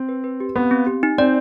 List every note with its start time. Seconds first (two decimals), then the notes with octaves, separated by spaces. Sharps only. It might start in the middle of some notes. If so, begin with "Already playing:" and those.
Already playing: C4
0.09 B4
0.24 B4
0.40 G4
0.56 B3 C4
0.71 C4
0.87 G4
1.03 D#4
1.18 C4 D5